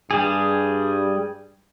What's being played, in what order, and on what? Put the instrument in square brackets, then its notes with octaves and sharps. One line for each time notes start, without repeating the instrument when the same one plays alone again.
[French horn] G2 [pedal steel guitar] G3 G#4